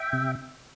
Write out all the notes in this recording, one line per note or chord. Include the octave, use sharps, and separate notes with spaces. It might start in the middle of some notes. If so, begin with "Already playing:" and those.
Already playing: E5 G5
C3